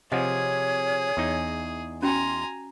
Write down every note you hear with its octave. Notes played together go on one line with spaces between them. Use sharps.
C3 F3 G#4 C#5 D#5 F#5 G#5
E2 D#4
C#4 F#4 G5 G#5 A#5 C6